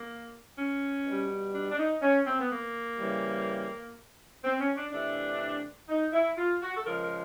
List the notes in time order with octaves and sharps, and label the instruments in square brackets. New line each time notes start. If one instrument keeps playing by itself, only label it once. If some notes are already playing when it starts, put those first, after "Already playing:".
Already playing: [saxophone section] A#3
C#4
B2 G3
D4
D4
D#4
C#4
C4
B3
A#3
C#3 E3 G3
C4
C#4
D4
C3 E3 A3 D4
D#4
E4
F4
F#4
A4
C#3 F3 G#3 A#4
A#4